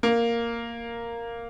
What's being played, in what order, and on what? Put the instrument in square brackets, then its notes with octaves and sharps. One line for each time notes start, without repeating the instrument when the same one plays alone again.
[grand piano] A#3